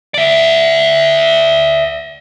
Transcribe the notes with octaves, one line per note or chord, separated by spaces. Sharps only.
D5 E5